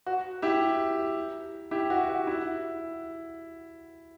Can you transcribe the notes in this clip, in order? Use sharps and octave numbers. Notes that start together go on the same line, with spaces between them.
F#4
E4 G4
E4 G4
F#4
F#4
E4